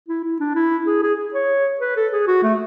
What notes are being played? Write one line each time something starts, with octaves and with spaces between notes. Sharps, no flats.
E4
E4
D4
E4
G#4
G#4
C#5
B4
A4
G#4
F#4
A3